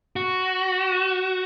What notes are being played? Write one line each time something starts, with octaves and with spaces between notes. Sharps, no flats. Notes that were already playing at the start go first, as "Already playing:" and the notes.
F#4